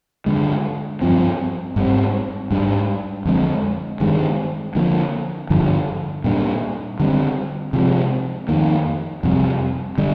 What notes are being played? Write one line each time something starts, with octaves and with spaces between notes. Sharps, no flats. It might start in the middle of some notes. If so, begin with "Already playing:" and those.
G2 D3 G#3
G2 F3 C4
G#2 G3 C4
G#2 G3 D4
F2 D3 G#3 C4
G2 D#3 G#3
D3 F3 A#3
G2 D3 F3
A#2 G3 A#3 D4
D3 G3 C4
C3 F3 G#3
F2 D#3 A#3
F2 C3 G3
D3 G3 D4